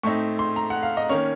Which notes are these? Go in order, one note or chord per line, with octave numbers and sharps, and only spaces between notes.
A2 A3 C4 D#4 C#6
C6
A#5
F#5
F5
D#5
D#3 A#3 C#4 C#5